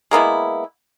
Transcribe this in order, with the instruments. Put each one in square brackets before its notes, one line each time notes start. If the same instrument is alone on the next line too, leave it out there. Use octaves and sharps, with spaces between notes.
[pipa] G#3 A#3 B3 E4